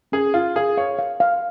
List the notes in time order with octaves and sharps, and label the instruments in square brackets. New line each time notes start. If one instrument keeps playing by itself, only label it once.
[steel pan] C#4 [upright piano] G#4
[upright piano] F4 [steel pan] F5
[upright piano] G#4 [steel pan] F5
[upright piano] C#5 [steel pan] F5
[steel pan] F5
F5